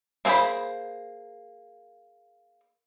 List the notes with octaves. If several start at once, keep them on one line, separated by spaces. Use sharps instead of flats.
A#3 C4 G#4 C5 B5